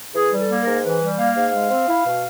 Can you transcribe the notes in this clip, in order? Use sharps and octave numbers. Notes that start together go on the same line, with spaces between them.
E3 G#4
G3
A4
A#3
A#4
G#2
E3 B4
G3
A#3 F5
G#2
G#3
C4
E4
B2